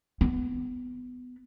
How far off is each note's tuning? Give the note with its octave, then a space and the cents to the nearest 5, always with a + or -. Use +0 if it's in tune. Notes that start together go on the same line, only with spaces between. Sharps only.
B3 +15